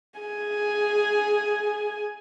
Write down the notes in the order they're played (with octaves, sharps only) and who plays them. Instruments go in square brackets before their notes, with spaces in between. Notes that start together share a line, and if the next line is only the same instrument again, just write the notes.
[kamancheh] G#4 G#5